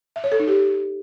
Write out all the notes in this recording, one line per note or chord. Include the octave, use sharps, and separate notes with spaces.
E5
C#5
A4
D#4
G4